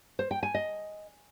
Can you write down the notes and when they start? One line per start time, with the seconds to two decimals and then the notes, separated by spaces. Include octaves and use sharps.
0.19 C5
0.31 G5
0.43 G#5
0.55 D#5